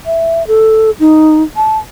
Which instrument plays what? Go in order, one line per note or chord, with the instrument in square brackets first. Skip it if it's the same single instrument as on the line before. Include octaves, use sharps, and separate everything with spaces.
[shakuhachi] E5
A4
D#4
A5